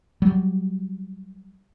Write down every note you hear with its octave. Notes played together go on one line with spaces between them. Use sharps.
F#3 G3